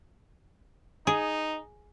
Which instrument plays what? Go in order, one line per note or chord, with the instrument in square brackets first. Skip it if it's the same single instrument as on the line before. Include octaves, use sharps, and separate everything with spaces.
[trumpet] D#4 [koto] G#4